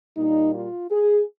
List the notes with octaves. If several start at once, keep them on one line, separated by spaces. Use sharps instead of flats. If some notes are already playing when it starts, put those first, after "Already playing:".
A#2 G3 A#3 D#4
F4
G#4